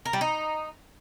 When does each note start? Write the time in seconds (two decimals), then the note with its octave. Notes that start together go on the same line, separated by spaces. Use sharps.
0.05 A#4
0.13 G3
0.21 D#4